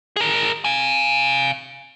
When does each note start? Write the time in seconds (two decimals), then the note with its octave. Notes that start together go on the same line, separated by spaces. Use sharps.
0.16 G#4 A#4
0.64 F5 G#5